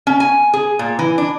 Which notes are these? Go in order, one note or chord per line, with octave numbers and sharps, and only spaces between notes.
C#4
G#5
G#4
A#2
E3
D4